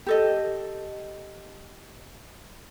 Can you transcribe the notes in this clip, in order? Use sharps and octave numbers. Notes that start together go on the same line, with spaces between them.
G4 A4 D#5